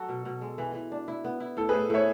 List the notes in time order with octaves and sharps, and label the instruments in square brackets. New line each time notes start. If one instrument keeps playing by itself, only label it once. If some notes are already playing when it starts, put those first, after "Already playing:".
Already playing: [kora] F#3 F#4 [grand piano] A4
[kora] B2
B2
G#3
E3
E3
D4
E4
B3
E4
[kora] A2 [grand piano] A4
[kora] A2 [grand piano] G#4 B4
[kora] A2 [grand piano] C#5 E5